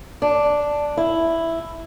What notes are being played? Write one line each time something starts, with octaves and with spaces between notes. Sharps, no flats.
D4
E4